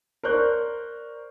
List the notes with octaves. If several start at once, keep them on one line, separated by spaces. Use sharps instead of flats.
A#4 C5 D5 C#6 F#6 G6